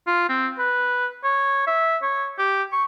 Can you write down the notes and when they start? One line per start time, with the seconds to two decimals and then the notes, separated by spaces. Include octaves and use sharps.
0.07 F4
0.29 C4
0.59 B4
1.24 C#5
1.67 E5
2.02 C#5
2.38 G4
2.72 C#6